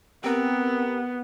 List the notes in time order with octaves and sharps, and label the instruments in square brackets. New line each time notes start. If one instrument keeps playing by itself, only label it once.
[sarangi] B3 [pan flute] C4 [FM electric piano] G4 A#4